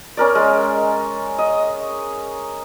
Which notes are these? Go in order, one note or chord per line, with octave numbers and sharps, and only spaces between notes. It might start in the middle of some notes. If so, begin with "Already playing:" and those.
C#4 A#4 D5
G#3
D#5